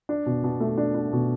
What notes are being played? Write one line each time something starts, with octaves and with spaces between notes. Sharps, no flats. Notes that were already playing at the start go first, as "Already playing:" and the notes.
D4
B2
B2
A3
D4
D4
B2